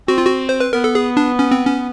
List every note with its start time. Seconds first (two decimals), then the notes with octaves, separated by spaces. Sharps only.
0.08 C4 F#4
0.18 F4
0.27 F#4
0.49 C5
0.60 B4
0.73 B3 A#4
0.84 A4
0.95 G#4
1.17 D4
1.39 C#4
1.51 C4
1.66 C#4